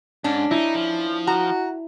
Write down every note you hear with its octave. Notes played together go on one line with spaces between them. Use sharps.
G#2 C#4 D4
D#4 E4
F3
F#4 A#5